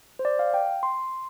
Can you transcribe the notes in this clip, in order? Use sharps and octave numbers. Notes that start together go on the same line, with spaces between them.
C5
D5
F5
G5
C6